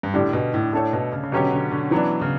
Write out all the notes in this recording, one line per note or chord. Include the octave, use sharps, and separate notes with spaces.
G2
A2 D3 G3 D4 G4 D5
B2
A2
A2 A3 D4 A4 C#5
B2
C#3
C#3
B2 D3 F#3 C#4 G4 C#5
D3
D3
E3 F#3 B3 D4
C#3